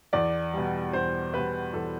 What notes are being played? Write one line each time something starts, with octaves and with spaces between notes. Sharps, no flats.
E2 D5
B2 G3
E2 C5
B2 G3 B4
E2 A4